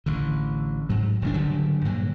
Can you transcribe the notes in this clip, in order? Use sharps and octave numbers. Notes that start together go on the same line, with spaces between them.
A1 D3
G#2 F#3
E1 D2 G3 D4
F#1 D3 F#3 G3
G2 A#2 D3 F#3